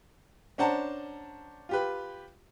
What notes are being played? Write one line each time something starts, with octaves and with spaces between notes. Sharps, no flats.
C#4 D4 C5 F#5 A5 A#5
F4 G4 B4